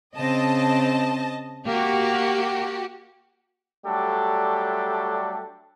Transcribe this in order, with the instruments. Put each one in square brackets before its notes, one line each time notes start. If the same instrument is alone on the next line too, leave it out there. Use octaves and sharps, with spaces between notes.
[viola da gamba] C#3 C4 [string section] D#5 A5
[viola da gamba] A#3 [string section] F#4 G4
[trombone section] F#3 G3 A3 D4 G4 A4